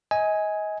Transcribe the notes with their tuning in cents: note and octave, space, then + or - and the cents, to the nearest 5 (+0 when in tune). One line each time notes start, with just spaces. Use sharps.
D#5 +30 G#5 +0